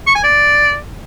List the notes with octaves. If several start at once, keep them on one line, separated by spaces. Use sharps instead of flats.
C#6
G#5
D5